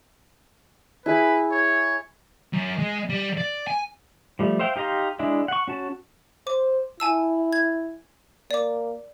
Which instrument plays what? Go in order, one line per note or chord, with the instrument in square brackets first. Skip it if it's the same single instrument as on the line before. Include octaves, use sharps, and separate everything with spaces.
[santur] E4 G#4 [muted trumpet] B4
[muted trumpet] C#5
[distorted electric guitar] F#2
G#3
G3
D5
G#5
[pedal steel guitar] F3 G3 A3
C5 E5 F5 G5
D#4 G4 F5 A#5 C6
G#3 D4 E4 E5
F#5 C#6
C#4 F#4 A5
[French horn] C5 [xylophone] D6
[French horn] E4 [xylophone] G#5 A5 E6
[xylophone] G#6
[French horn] A#3 [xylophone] D5 D6